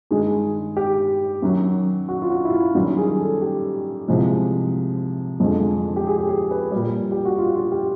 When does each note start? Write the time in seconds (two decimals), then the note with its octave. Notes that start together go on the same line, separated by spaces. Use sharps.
0.11 G2 D#3 G#3 G#4
0.77 G4
1.42 F#2 D#3 F#3
2.09 F#4
2.22 F4
2.30 F#4
2.45 E4
2.52 F4
2.75 F#2 D#3 G3 F#4
2.97 G#4
3.19 A4
3.42 G4
4.08 C2 C3 F3 G#3
5.40 F2 D3 F3 G#3
5.96 G4
6.06 G#4
6.18 G4
6.29 G#4
6.51 B4
6.72 A#2 G3
7.12 G4
7.25 F#4
7.38 F4
7.56 F4
7.72 G4